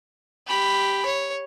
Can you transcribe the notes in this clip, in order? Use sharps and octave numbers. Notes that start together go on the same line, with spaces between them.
G4 B5
C#5